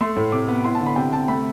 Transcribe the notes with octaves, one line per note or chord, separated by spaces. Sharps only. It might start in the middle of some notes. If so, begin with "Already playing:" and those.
A3 C6
A2
C3 D6
B3
E4 C6
A5
D3
B5
C3 G5
C3 A5
A3 B5